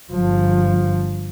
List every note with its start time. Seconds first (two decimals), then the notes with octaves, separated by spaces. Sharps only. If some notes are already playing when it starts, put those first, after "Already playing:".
0.13 G1 F3